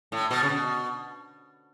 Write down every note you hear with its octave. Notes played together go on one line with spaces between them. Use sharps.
A2
B2
C#3
B2